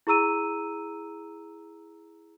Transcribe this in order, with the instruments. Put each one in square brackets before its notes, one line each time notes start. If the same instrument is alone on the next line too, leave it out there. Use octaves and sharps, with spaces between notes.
[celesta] E4 G#4 A#5 E6 D#7